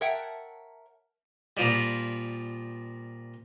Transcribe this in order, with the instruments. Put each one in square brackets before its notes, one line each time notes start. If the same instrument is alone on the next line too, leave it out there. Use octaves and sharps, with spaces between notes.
[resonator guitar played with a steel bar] A#4 C#5 E5 F#5 G5 A5
[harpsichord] A#2 F3 G3